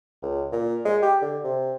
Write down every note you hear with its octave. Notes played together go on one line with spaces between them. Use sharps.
C#2
A#2
G#3
G4
D3
C3